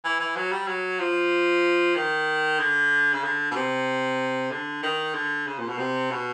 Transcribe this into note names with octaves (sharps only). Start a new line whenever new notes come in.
E3
E3
F#3
G3
F#3
F3
D#3
D3
C#3
D3
B2
C3
D3
D#3
D3
C#3
A#2
B2
C3
B2